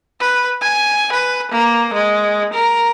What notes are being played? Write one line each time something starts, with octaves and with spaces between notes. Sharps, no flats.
B4
G#5
B4
A#3
G#3
A#4